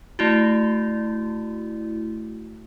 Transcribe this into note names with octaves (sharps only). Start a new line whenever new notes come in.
A3 E4 F#4